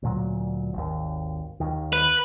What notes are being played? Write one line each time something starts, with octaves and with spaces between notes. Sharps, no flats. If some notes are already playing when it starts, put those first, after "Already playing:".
D2 A#2 F#3
G#1 D#2
D#2 D#3
B4